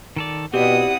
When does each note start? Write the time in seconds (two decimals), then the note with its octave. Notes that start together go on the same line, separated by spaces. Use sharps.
0.16 D#3 A4 D5
0.54 B2 C4 E4 G4 D5 F#5 D#6